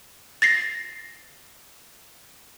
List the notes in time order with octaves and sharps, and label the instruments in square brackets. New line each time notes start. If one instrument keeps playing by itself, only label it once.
[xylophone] A6 A#6 C7